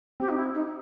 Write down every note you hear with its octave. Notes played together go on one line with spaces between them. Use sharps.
C4 G4
D#4
E4
D#4